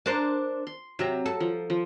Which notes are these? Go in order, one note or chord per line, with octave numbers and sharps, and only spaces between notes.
D4 A#4 C5
C6
C3 F#3 E5 A#5
A4
F3
F3